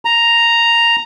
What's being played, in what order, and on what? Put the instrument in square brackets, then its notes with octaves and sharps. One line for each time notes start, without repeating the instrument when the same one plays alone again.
[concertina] A#5